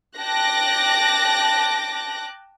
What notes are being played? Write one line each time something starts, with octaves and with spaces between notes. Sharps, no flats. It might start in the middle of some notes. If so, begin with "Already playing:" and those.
G5 A5 D6 F#6 A#6